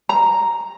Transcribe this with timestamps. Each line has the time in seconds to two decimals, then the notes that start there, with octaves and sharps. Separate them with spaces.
0.09 A#5